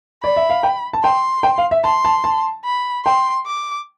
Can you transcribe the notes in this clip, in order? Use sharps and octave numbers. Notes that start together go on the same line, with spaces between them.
D5 B5
E5
F5
G5
A5
G5 C6
G5
F5
E5
A5 C6
A5
A5
B5
G5 C6
D6